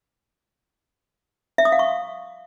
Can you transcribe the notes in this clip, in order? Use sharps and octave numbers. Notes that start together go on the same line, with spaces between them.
E5
D#6
F5
C#6